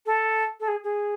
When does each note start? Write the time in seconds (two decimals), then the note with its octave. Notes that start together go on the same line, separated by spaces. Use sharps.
0.06 A4
0.60 A4
0.68 G#4
0.84 G#4